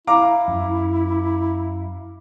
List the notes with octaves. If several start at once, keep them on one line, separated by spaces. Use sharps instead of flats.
E4 F5 A#5 D6
F#2